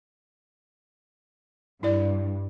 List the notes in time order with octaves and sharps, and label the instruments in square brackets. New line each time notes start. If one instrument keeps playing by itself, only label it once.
[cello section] G2 [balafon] E4 D5